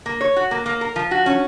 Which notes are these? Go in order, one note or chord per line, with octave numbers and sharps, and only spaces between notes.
A#3
C#5
F#4
A#3
A#3
A#4
F3
F#4
C#4